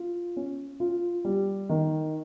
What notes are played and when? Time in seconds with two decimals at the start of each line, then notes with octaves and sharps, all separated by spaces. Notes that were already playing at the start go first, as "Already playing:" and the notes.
Already playing: F4
0.37 C#4
0.80 F4
1.25 G3
1.69 D#3